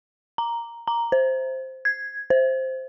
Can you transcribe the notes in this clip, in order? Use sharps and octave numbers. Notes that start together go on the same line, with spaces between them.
A#5
A#5
C5
G#6
C5